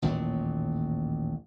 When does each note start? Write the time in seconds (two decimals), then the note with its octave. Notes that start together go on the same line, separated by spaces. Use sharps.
0.02 A1 D#2 A#2 F#3